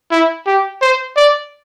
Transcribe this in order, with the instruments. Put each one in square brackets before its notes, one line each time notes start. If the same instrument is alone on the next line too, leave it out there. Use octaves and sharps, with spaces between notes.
[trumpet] E4
G4
C5
D5